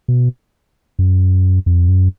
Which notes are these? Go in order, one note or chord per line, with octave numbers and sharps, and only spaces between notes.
B2
F#2
F2
F#2